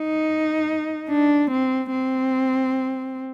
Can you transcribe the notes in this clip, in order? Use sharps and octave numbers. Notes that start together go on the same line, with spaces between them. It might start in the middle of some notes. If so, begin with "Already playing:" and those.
Already playing: D#4
D4
C4
C4